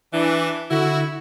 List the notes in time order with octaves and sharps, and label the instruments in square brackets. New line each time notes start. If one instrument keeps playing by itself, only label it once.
[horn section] E3 D4
[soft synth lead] D3 [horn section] E4 F#4